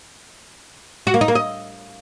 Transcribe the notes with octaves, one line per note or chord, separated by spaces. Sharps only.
F#4
A#3
D#4
A#3
D#5